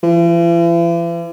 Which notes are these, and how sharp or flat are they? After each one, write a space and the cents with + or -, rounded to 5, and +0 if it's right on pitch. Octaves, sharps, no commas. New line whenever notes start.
E3 +45